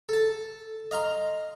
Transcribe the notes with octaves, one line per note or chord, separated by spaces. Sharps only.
A4 A5
D#5 F5 A#5 C6